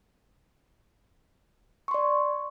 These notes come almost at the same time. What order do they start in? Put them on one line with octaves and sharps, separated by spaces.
C#6 C6 D5